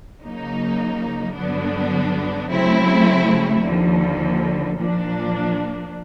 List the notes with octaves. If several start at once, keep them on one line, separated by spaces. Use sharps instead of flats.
C#3 F#3 A#3 D#4
G2 D3 F#3 B3 D4
C#3 F#3 A3 C4 E4
D#2 D3 F3
A#2 F3 A#3 D4